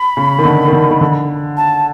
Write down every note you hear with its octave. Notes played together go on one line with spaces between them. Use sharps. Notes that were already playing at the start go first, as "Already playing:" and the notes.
Already playing: B5
C#3
D#3
D3
D#3
D3
D#3
D3
A5